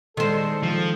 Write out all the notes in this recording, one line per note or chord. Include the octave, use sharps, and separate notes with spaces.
D#3 G#3 A4 C5
F3